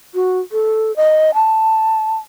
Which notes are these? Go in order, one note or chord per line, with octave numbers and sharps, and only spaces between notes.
F#4
A4
D#5
A5